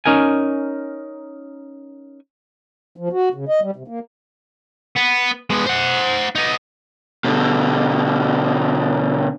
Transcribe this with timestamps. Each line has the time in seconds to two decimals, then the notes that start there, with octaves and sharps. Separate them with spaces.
0.06 C#4 D#4 A#4 G#5
2.97 F3
3.12 F#4
3.34 C#3
3.48 D#5
3.62 G3
3.76 C3
3.88 A#3
4.96 B3
5.50 G#3 B3
5.66 C5 F#5
6.36 B3 D#4
7.25 B2 D3